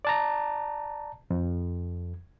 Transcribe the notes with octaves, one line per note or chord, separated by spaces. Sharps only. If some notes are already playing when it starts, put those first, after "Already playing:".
D5 A5 A#5
F2